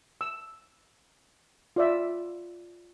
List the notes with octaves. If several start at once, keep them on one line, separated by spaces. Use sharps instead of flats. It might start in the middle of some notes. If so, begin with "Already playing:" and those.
E6
F4 D5 E5